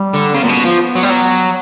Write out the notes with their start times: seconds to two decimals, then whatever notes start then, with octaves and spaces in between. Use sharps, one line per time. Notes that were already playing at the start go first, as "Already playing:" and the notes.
Already playing: G3
0.14 D3
0.33 C#3 B3
0.44 A#2
0.49 B2
0.64 F3
0.95 F#3
1.03 G3
1.09 F#3